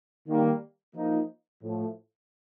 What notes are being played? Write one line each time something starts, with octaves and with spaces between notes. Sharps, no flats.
D#3 G3 A#3
F3 A#3 D#4
A2 F3 A3